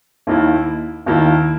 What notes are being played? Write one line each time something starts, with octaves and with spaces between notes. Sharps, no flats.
D#2 D#3 A#3 E4
D#2 D#3 A#3 E4